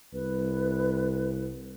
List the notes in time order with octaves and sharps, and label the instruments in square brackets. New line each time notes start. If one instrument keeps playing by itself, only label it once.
[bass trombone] C2 [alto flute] B4